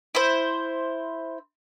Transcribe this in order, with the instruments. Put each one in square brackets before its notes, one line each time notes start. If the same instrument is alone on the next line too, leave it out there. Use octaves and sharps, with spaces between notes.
[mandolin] E4 C5